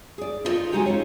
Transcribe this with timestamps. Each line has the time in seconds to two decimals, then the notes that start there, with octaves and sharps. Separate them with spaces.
0.18 G#4 D5
0.45 E4 F4 A4 C5 D#5
0.72 C#3 F3 G#3 D#4 F#4 G4
0.86 C4 C#4 F4 C#5